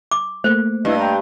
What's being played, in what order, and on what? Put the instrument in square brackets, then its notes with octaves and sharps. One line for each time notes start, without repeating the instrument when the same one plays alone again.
[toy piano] D6
[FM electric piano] A3 A#3 [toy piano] C5
[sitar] G2 [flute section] E4 B4 D#5
[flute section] D#5 G5 A#5